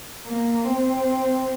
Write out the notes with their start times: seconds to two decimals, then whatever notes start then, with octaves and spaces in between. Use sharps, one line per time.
0.24 A#3
0.65 C4